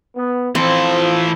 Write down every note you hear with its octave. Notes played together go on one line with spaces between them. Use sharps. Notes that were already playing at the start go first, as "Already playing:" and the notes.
B3
E3 F3 C4 A4